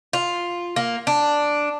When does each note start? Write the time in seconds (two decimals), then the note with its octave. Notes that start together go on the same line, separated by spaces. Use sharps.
0.13 F4
0.76 A#3
1.07 D4